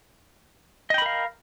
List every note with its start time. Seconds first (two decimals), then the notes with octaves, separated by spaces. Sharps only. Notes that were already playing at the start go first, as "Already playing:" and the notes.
0.90 D#5
0.94 G5
0.98 B5
1.02 A#4
1.06 F5